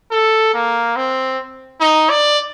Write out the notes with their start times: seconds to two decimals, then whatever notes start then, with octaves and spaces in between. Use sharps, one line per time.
0.11 A4
0.53 A#3
0.96 C4
1.80 D#4
2.10 D5